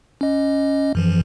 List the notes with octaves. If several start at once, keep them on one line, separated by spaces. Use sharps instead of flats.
C#4 D#5
F#2 E3 F3